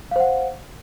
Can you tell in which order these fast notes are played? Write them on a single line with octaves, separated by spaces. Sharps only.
F5 C5 F#5